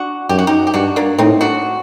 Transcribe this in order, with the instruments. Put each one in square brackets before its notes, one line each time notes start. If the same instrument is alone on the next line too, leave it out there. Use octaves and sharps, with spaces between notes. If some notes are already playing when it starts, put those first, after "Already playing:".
Already playing: [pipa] D4 F#4
[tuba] F#2 [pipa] G4
[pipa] F#4
D#4 G4
G4
[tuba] G2 [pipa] D4 F#4
[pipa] A#3 D4
[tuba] A2 [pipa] C4 D#4
[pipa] D4 F#4